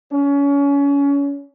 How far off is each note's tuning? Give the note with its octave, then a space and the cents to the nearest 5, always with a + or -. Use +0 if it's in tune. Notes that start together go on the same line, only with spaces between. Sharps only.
C#4 +30